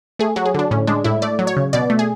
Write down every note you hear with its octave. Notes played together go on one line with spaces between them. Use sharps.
A3 G#4
F#3 F#4
G#4
D3 D4
A2 C#4
G#3 D4
A2 E4
A3 D5
F#3
C#5
C#3
B2 D5
A3
G#4